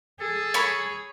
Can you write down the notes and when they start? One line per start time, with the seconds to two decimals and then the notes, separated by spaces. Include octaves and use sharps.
0.20 G#4 A4
0.54 C#5 B5